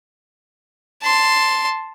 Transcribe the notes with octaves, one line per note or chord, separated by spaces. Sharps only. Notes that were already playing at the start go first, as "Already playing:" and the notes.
A5 C6